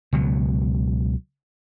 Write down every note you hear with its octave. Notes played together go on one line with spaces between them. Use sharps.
C#2 B2 F#3